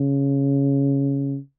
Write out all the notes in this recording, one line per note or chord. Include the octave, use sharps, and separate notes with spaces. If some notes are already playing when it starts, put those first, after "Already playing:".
Already playing: C#3